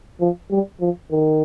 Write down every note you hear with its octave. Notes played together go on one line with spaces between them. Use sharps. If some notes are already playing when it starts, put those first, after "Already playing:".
F3
G3
F3
D#3